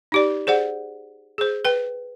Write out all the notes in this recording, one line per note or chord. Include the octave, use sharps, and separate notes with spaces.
D#4 G4 D5
G#4 C5 D5 F#5
G#4 C5
B4 G5